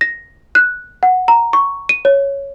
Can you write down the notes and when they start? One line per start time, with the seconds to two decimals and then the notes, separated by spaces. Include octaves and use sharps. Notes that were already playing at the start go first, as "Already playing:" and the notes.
0.01 A#6
0.55 F#6
1.03 F#5
1.28 A#5
1.53 C#6
1.89 D#7
2.05 C#5